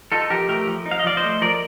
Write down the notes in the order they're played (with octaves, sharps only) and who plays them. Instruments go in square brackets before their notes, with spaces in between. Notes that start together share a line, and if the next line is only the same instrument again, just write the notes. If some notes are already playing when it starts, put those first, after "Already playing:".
[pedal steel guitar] D#4 F4 A4
F3 G4 A#4
A3 G4 A#4
F3
D#4
F5
D#5
F3 D5 F5
C5 D#5
A3
F3 A#4 D5